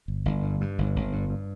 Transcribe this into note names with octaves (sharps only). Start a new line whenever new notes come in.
G1
G1
G2
G2
G1
G1
G2
G2